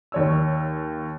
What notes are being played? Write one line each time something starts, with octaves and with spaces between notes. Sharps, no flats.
D#2 C#5 E6